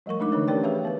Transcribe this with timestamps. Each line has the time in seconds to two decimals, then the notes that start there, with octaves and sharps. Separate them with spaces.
0.06 F3 G3 A3 A#4 C#6
0.20 G#3 A3 D4 D#4 A#4 D6
0.32 D3 E3 A#4 C#5
0.48 C#4 G4 A#4 C#5 D5 G5
0.63 G4 G#4 B4 C#5 E5 F5
0.85 B3 B4